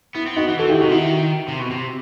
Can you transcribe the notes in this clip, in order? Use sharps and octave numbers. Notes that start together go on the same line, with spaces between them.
B3 E4
C4
B3 D#4 F#4
E3
E3 F#4 A4
D#3 E4 G4
C3 D#4 F#4
D#3 E4
C3
B2
C3